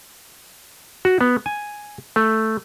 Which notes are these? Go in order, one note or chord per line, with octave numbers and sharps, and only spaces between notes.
F#4
B3
G#5
A3